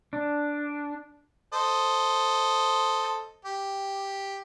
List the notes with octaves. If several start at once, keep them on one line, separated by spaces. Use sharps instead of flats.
D4
A4 C5 D#5
G4